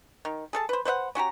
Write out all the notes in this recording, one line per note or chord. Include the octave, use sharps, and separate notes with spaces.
D#3
G#4 A4 A5
B4 C5
B4 C5 E5 F#5
C#4 F#4 G4 A#5